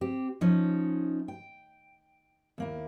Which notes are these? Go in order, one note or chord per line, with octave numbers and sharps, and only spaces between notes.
C4 G4
F3 C#4 D#4
G5
D#2 A#3 E4